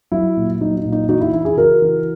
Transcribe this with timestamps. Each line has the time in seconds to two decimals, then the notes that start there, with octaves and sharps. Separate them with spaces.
0.12 F#3 E4
0.37 A#2
0.61 F#3 D#4
0.77 D#4
0.85 A#2
0.92 D#4
1.09 E3 D#4 F#4
1.21 E4
1.33 E3 E4
1.45 E4 G#4
1.57 C#3 F#4 A#4
1.82 E3